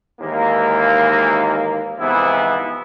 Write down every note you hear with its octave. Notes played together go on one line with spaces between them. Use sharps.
D#2 G#2 E3 A#3
G#2 C3 E3 F3 B3 E4